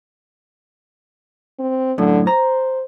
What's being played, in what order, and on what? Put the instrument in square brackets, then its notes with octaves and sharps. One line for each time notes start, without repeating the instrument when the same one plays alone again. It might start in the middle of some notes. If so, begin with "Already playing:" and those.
[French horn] C4
[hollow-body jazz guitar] F#2 A2 [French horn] D3
[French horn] C5 [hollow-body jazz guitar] A#5